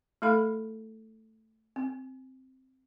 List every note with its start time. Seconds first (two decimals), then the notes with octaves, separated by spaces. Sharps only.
0.22 A3 E4 A4 F5 B5
1.76 C4